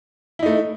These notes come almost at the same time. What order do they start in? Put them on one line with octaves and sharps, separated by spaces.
E4 D#4 A3